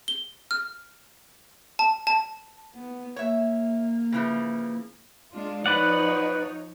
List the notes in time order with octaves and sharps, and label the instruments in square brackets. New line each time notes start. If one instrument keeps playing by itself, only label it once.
[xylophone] G7
F6
A5
A5
[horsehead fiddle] B3
[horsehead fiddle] A#3 [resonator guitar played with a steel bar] C#5 E5
[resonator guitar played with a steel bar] C#3 E3 F3
[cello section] G#3 D4 F4
[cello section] F3 D#4 C#5 [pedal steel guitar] B4 D5 F#5